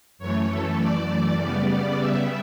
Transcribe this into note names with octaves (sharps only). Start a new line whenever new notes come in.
F#2 E3 A3 C#5
A4
D5
C#3 G3 B3
E5